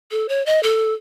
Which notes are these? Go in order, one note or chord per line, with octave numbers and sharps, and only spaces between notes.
A4
C#5
D#5
A4